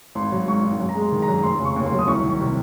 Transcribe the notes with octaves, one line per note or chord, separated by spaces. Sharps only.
G#1 C6
F#3
G#2 C#6
G#1
F#2
A#5
G#3
C6
D#3
A#5
F#2
F1 C6
C#3
C#6
D#2
C6
F#3
D#6
C2 C#6
D#3
C#6
C3